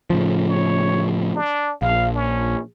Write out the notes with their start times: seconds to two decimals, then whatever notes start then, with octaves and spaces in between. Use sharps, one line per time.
0.10 A2 C#3 F3
0.49 C#5
1.36 D4
1.82 A#1 F5
2.15 C#4